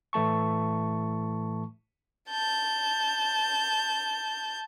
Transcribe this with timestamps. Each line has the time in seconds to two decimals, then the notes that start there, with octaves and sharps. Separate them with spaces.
0.13 A2 E3 A3 A5 C#6
2.29 A5 G6